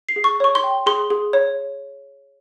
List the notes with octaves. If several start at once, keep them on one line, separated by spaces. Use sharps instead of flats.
C7
G#4
C#6
C#5 C#6
C6
G5
G#4 C6
G#4
C#5